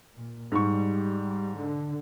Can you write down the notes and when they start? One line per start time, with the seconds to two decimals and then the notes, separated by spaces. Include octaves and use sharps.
0.16 A#2
0.52 G#2 G3 C#6
1.57 D3